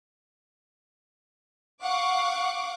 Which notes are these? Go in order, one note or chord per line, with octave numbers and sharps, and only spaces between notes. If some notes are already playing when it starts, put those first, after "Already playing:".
F5 F#5 C#6 D6